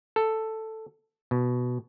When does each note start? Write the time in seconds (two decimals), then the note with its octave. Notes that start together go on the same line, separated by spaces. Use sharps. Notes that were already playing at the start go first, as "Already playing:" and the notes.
0.16 A4
1.31 B2